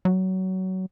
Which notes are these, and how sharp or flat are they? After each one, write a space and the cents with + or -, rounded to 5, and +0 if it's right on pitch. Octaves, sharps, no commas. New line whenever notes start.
F#3 +20